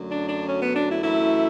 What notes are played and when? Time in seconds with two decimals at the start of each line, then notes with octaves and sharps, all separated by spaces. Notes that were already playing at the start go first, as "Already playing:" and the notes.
Already playing: F#2 D3 F#3 A3
0.09 D4
0.28 D4
0.47 C#4
0.60 B3
0.74 D4
0.89 E4
1.02 F#2 E3 A3 E4